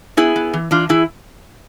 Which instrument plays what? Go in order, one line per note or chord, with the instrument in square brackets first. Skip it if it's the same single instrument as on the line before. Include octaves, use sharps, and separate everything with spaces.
[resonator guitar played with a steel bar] B3 E4 G#4
B3
E3
E3 D4 F4
E3 E4 G#4